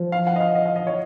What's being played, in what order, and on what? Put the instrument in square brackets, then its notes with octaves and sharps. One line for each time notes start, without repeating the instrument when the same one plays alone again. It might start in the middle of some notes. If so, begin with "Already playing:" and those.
Already playing: [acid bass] F3
[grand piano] F5
F#5
D#5
F5
D#5
F5
D#5
C#5